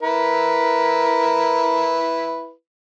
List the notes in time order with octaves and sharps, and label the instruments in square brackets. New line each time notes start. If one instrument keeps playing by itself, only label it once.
[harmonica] E4 B4 [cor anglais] A#4